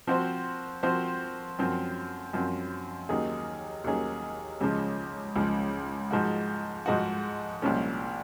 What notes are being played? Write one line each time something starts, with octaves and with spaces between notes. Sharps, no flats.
F3 C4 F#4 C5
F3 C4 F#4 C5
F#2 F3 C4
F#2 F3 C4
D#2 D#3 F#3 C#4 G#4
D#2 D#3 F#3 C#4 G#4
C#2 C#3 F3 G#3
C#2 C#3 F3 G#3
G#2 F3 G#3 D#4 F#4
G#2 F3 G#3 D#4 F#4
C2 A#2 F3 G#3 C#4